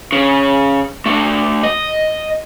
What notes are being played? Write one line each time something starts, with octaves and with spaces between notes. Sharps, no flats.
C#3
D2 A3
D#5